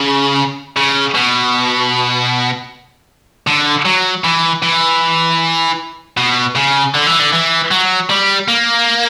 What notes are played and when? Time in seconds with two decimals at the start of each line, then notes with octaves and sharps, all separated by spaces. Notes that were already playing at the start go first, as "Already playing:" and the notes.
Already playing: C#3
0.77 C#3
1.14 B2
3.47 D3
3.85 F#3
4.24 E3
4.62 E3
6.17 B2
6.55 C#3
6.95 D3
7.07 E3
7.19 D3
7.33 E3
7.71 F#3
8.10 G3
8.48 A#3